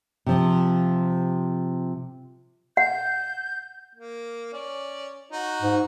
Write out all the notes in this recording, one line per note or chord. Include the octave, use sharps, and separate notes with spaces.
C3 F3
F#5 G6
A#3
C#4 D5
D#4 F#4
G#2